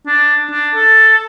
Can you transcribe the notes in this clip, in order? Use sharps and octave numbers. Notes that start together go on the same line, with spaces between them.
D4
D4
A4